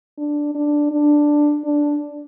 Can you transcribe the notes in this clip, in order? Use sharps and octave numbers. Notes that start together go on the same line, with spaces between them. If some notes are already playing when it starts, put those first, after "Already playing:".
D4
D4
D4
D4